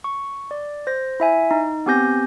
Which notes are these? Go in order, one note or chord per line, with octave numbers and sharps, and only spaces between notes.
C#6
D5
C5 A#6
E4 E5 G#5
D#4
B3 C4 G4 G#5 G6 A#6